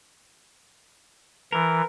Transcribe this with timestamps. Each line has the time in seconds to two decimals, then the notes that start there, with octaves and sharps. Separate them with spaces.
1.52 E3 A#4